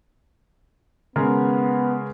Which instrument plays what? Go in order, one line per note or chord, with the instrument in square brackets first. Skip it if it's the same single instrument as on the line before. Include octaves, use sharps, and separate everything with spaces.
[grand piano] C#3 G#3 A#4 [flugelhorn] B3